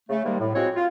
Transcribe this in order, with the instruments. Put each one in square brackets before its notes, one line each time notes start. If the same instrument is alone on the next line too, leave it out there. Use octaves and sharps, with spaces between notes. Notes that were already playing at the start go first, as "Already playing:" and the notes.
[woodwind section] C#3 A3
C3 D#3 G3 G#3 A#3
A2
F3 G#3 C4 F#4 C#5
F4